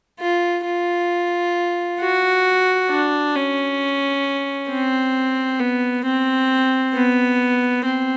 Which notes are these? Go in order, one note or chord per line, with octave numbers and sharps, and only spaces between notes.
F4
F4
F#4
D4
C#4
C4
B3
C4
B3
C4